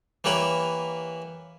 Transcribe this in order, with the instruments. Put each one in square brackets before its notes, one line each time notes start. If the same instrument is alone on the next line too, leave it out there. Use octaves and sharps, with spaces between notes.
[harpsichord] E3 A#3 G4 B4 C#5 B5